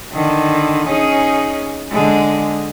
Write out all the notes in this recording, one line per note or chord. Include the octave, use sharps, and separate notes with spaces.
D3 D#3
C#4 D#4 G#4
D3 G#3